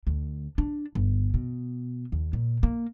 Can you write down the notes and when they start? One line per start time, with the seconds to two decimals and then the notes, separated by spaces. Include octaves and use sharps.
0.07 D2
0.58 D4
0.95 G1
1.34 B2
2.12 D#2
2.33 A#2
2.63 A#3